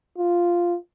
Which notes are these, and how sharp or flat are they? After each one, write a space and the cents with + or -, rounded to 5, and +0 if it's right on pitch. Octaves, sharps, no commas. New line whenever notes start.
F4 -5